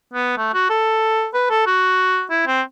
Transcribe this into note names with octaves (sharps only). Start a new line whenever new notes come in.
B3
A3
F#4
A4
B4
A4
F#4
E4
C4